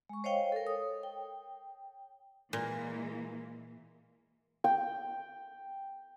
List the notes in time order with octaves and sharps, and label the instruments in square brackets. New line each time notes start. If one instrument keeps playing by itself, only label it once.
[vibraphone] G#3 C#6
C5 C#5 D#5 F5 G5
A4 A#4
C#5 D#6
G5
[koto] A#2 [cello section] E3 G#3 A#3
[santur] G5